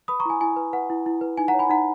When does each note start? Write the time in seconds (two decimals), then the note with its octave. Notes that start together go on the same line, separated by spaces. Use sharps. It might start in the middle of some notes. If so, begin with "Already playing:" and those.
0.08 B4 B5 D#6
0.20 A#5 C#6
0.25 E4 G#5
0.41 E4 G#5
0.56 B4
0.73 B4 F#5
0.90 E4
1.06 E4
1.21 B4
1.37 D#4 G#5
1.48 F#5 A#5
1.54 C#5
1.59 G#5 B5
1.70 D#4 F#5 A#5